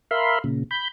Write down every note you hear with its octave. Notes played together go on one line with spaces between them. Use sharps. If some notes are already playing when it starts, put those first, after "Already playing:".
A#4 E5 F5 B5 C6
A#2 C#3
B5 G6